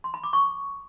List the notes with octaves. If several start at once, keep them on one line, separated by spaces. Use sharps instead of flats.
C6
B5
D6
C#6